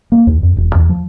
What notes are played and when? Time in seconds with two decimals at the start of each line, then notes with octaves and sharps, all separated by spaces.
0.12 A#3
0.27 D#2
0.43 F2
0.57 E1
0.75 E2
0.89 F3